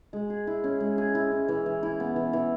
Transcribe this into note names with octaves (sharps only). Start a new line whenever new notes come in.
G#3
G#4
E4
C#4
G#3
G#4
E4
C#4
E3
E3
E4
B3
E3
E3